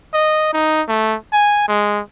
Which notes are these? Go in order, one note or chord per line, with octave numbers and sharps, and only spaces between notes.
D#5
D#4
A3
G#5
G#3